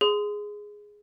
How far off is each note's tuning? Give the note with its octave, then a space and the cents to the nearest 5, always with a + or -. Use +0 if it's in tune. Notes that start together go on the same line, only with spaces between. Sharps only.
G#4 +0 C6 -30